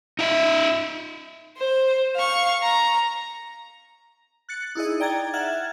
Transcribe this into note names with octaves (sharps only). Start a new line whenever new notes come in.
D#4 E5
C5
F5 C#6
A#5
F#6 A6 C#7
D#4 E4 G#4 D#5
D5 G5 A#5 G#6 A6
E5 F#5 F6 F#6 G#6 A6